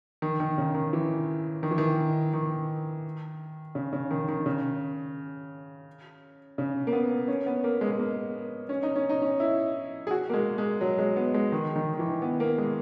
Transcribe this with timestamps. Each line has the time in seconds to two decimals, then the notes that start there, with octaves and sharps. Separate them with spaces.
0.22 D#3
0.40 D#3
0.58 C#3
0.75 D#3
0.93 E3
1.63 D#3
1.71 E3
1.78 D#3
2.33 D#3
3.75 C#3
3.93 C#3
4.11 D#3
4.28 D#3
4.46 C#3
6.58 C#3
6.87 A#3
6.93 B3
7.28 C#4
7.46 B3
7.64 A#3
7.81 G#3
7.91 G#3
7.99 A#3
8.69 C#4
8.83 D#4
8.96 C#4
9.09 D#4
9.22 C#4
9.40 E4
10.07 G#4
10.11 F#4
10.29 A#3
10.33 G#3
10.58 G#3
10.81 F#3
10.99 G#3
11.16 B3
11.34 G#3
11.52 D#3
11.76 D#3
11.94 D#3
11.99 E3
12.22 B3
12.40 A#3
12.58 G#3